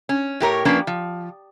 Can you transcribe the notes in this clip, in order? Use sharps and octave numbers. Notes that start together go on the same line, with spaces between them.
C#4
A2 G4 A#4 C#5
F3 A#3 C#4 D4 B4
F3